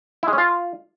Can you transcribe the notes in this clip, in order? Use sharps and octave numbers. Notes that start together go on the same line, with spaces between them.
E4
G#3
C#4
F4